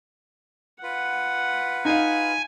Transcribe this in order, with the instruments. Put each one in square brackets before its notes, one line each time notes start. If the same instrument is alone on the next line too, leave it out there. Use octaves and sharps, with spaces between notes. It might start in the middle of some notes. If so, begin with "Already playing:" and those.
[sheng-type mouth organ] F4 B4 [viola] F#5
[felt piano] D#4 F5 [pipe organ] G#5